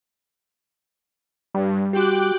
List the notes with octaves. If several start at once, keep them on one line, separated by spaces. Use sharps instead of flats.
G2 G3
F#4 G4 G5 D6 F#6